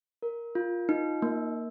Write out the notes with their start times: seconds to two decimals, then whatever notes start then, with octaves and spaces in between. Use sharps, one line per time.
0.23 A#4
0.55 F4
0.89 D#4
1.22 A#3